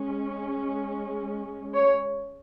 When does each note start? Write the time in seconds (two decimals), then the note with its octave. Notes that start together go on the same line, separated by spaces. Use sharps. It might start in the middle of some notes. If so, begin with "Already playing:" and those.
Already playing: G#3 C#4
1.75 C#5